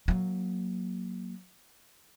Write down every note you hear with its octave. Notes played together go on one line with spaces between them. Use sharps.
F#3 A#3